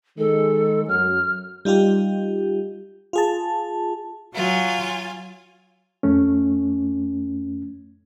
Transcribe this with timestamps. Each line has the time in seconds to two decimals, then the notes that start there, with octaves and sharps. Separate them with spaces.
0.18 D#3 G#3 A4
0.88 F#2 F#3 F6
1.65 G3 D#4 F4 G4
3.13 F4 G#4 A5
4.35 F#3 F4 G#5
6.03 F2 A3 C#4